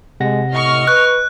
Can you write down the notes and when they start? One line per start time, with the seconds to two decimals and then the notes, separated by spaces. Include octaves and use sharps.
0.20 C3 G#3 F#5 A#6
0.52 A2 D#5 C#6 F6
0.88 B4 F#6